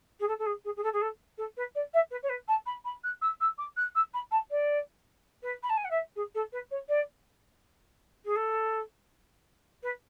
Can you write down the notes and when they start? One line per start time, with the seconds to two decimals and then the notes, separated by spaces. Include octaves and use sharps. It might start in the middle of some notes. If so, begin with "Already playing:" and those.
0.20 G#4
0.28 A4
0.39 A4
0.46 G#4
0.65 G#4
0.76 G#4
0.83 A4
0.93 G#4
1.01 A4
1.38 A4
1.57 B4
1.75 D5
1.94 E5
2.11 B4
2.23 C#5
2.29 B4
2.48 A5
2.66 B5
2.84 B5
3.04 F#6
3.22 E6
3.41 E6
3.58 D6
3.77 F#6
3.95 E6
4.14 B5
4.31 A5
4.51 D5
5.43 B4
5.63 B5
5.69 A5
5.77 G#5
5.85 F#5
5.91 E5
6.16 G#4
6.34 A4
6.52 B4
6.71 C#5
6.89 D5
8.25 G#4
8.36 A4
9.83 B4